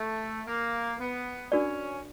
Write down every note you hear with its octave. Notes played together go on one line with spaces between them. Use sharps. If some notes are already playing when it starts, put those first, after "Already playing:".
Already playing: A3
A#3
B3
C#4 D4 F#4 A#4 D5